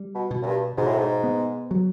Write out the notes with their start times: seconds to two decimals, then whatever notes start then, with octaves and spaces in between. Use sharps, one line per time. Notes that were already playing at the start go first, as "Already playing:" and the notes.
Already playing: G3
0.15 B2
0.31 B2
0.42 F#2
0.46 G2
0.77 G#2 B2
0.87 A2
0.98 G#2
1.24 B3
1.71 F#3